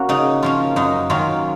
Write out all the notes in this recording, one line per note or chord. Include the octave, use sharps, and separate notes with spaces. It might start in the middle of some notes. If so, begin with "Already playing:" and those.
Already playing: A#3 C#4 F#4
C#3 D#4
F3 A#3 C#4 F4
F#2 D#4
D#3 F#3 A#3 C#4 F4